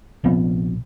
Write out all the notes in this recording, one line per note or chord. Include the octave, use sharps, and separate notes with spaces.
A#1 C3 F3 B3